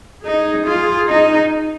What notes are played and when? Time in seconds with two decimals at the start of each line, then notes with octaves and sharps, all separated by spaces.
0.25 D#4 G#4
0.67 F4
1.09 D#4